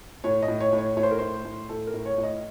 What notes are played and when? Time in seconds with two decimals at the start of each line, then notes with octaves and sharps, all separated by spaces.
0.24 A2 C#5
0.43 D#5
0.48 A2
0.60 C#5
0.73 A2
0.78 C#5
0.97 A2 C#5
1.03 C5
1.11 A#4
1.18 A2 C5
1.45 A2
1.69 A2 A4
1.87 A#4
1.94 A2
2.06 C#5
2.18 A2
2.23 D#5